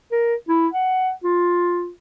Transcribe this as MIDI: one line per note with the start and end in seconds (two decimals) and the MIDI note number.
0.11 0.34 70
0.49 0.68 64
0.73 1.10 78
1.24 1.90 65